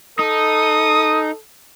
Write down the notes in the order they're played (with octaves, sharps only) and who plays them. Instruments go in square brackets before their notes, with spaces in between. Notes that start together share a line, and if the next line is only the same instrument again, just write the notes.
[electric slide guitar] D#4 [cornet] A4 [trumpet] D#6